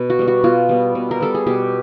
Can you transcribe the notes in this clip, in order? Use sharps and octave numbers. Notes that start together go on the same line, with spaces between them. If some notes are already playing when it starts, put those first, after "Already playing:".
Already playing: B2 B4
F#4
G3 B3
F#4
B2 F4
G3 B3
B2
A#4
G3 B3 A4
G#4
B2 G4